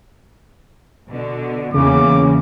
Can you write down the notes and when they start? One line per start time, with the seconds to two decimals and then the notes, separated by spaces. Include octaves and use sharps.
1.08 B2 D3
1.74 E2 C#3 E3 A#3 D6